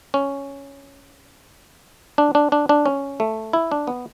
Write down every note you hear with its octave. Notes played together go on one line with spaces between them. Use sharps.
C#4
D4
D4
D4
D4
C#4
A3
E4
D4
B3